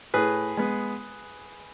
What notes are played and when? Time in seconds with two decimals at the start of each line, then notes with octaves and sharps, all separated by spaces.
0.14 A2 G#4 B4
0.57 G#3 B3